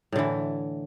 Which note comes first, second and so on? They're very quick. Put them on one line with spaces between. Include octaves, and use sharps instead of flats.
A2 D3 E3